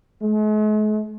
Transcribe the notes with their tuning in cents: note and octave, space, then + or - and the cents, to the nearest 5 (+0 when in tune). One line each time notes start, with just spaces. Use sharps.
G#3 +45